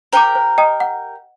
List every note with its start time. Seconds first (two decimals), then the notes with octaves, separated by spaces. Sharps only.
0.13 G4 A#4 C5 G5 A#5 D6
0.35 C5
0.58 D#5 G5 A#5 D#6
0.80 F#5